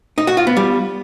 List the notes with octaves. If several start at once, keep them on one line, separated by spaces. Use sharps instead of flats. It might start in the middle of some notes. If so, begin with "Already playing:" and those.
D#4
F#4
F4
B3
G3